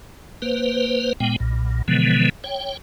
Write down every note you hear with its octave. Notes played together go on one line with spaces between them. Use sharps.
A#3 B4 C5
A#2 G#3 B3 G5
B1 A#2
B2 D3 E3 F3 G#3 B3
C#5 G5